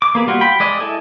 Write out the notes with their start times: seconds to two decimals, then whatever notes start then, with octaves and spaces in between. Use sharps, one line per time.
0.02 D6
0.15 A#3 B3 G#4
0.27 G3 F4 F#4
0.41 G5 B5
0.60 G#3 D5 D#5
0.80 E4 G#4 A4 D#5